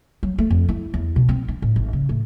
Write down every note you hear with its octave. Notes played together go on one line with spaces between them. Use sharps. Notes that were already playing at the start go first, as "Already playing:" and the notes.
F#3
A3
F2
E4
E2
B2
C4
D4
A2
G#1
C#3
A2